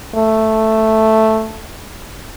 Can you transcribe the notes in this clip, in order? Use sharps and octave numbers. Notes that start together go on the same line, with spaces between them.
A3